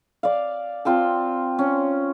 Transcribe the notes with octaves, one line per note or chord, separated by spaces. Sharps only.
D5 F5
C4 F4 G5 A5
C#4